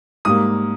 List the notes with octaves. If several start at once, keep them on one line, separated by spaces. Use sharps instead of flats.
G#2 G3 A#3 D#6